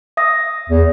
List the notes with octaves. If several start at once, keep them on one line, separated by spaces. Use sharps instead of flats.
E5 D#6 A#6
E2